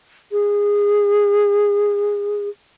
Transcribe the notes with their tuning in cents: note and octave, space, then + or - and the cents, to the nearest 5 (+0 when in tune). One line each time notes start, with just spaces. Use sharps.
G#4 -20